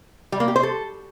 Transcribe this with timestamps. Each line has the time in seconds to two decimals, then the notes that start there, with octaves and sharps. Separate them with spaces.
0.32 G3
0.40 A#3
0.48 G4
0.56 C5
0.63 A4